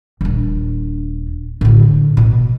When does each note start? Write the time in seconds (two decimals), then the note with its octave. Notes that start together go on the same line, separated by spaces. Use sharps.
0.21 D#1 D4
1.61 A2 D3
2.17 B2